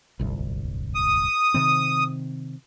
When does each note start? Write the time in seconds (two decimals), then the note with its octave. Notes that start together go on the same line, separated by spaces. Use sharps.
0.19 D1 G1 C2
0.95 D#6
1.54 C3 D#3 C4